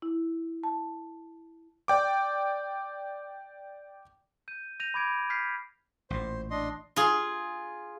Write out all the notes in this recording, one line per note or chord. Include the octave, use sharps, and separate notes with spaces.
E4
A5
D5 G5 D6
G6 D#7
G6 A#6 D#7 F7
B5 D6 G#6 D7
F6 G6 B6 C7
A1 A#2 C5
D4 D#5 C6
F4 G#4